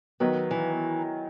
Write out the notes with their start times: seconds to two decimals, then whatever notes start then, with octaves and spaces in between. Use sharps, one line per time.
0.20 D#3 F#3 B3
0.51 E3